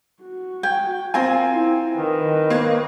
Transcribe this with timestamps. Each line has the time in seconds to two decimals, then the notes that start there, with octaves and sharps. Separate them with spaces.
0.22 F#4
0.63 G5 G#5
1.14 C4 F4 A#4 G#5 C6
1.51 E4
1.97 D#3 B4 D#5
2.50 A#3 C5 C#5